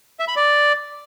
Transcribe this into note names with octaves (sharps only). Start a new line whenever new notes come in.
E5
B5
D5